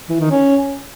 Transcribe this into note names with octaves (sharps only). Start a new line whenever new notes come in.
E3
D#3
C#4